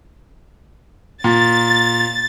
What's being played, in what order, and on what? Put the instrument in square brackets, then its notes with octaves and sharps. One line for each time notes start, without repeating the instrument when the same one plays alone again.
[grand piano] A#2 [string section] A6